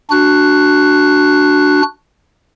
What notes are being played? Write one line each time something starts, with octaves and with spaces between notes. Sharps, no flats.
D4 F#4 F#6